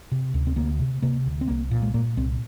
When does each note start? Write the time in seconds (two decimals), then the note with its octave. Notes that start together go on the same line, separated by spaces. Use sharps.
0.12 C3
0.34 D2
0.47 C4
0.56 D2 A#3
0.79 C3
1.02 C3 A#3
1.26 D2
1.41 C4
1.48 C2 A#3
1.71 A#2
1.82 G#3
1.94 A#2 A#3
2.17 C2 C4